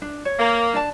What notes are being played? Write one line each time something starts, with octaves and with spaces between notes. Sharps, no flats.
D4
C#5
A#3
D4 D5 A5